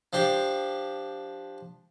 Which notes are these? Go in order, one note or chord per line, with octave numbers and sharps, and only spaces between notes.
F3 D4 G4